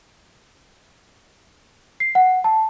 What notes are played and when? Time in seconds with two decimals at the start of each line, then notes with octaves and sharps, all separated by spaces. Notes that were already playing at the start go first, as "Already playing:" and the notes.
2.00 C7
2.15 F#5
2.44 A5